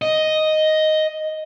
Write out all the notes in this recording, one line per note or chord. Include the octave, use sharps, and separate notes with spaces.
D#5